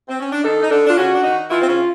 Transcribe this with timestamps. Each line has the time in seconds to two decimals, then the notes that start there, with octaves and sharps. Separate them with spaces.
0.09 C4
0.20 C#4
0.33 D4
0.44 D#3 D#4 A4
0.63 D#4
0.71 D3 D4 A4
0.87 D4 F4
0.98 C#3 C#4 F#4
1.15 D4
1.24 D#3 D#4
1.51 E3 E4 F4
1.62 C4
1.68 C#3 C#4